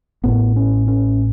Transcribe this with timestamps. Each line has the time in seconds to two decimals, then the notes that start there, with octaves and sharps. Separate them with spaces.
0.24 A1 A2 B3
0.56 C#4
0.87 C#4